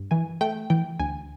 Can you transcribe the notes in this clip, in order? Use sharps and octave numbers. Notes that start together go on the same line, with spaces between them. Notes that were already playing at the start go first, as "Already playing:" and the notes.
Already playing: G2
E3 G#5
A3 G5
E3 G5
D2 G#5